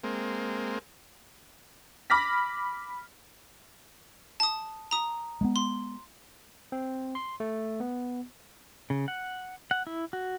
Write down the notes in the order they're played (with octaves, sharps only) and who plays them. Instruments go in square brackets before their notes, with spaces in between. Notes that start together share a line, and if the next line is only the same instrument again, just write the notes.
[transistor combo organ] G#3 A#3 C4
[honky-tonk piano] B5 D6 F6 A#6 B6
[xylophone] A5 D#6
A#5 D#6
[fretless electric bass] G#3 A3 B3
[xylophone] C6
[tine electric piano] C4
C6
A3
B3
[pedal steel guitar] C#3
F#5
F#5
E4
F#4